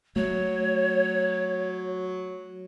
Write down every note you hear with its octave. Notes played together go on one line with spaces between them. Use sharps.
F#3 A3 C#5